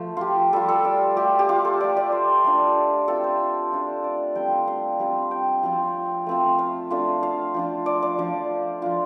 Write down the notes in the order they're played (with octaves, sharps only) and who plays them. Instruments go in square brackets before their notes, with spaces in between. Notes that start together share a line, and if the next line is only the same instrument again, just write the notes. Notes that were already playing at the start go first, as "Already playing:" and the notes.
Already playing: [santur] F3 A3
F4 G4
G3 F4 A4
A4
D5
A3 F4 G4
G4
F4
A4
A3 F4 D5
D5
C5
A3 D4 F4
A3 C4 F4 A4
C5
A3 D4 F4
D5
G3 C4 F4 G5
F5
F5
G3 C4 F4
G5
F3 C4 F4 F5
A3 C4 F4
F5
A3 D4 F4
F5
F3 D4 F4
D5
D5
F3 D4 F4
F3 D4 F4 F5